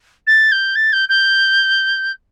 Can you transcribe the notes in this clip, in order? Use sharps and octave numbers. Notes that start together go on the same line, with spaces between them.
A6
G6
A6
G6
G6